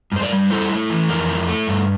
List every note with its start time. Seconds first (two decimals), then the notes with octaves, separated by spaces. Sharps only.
0.12 G2 C5
0.22 A#4 D5
0.32 G3
0.50 E4 A4 C5
0.71 A3
0.90 E3
1.09 F2 G4 A#4
1.29 E4
1.48 A3
1.67 G2